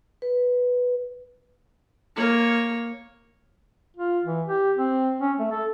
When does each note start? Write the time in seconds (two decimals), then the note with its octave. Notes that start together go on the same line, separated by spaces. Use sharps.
0.22 B4
2.16 A#3 C#5
3.97 F4
4.25 E3
4.47 G4
4.77 C4
5.21 C#4
5.39 A3
5.51 A4